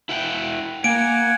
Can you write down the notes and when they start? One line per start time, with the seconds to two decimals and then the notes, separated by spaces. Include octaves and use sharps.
0.09 E4 F#5 G5
0.84 A#3 F#5 G#5 D7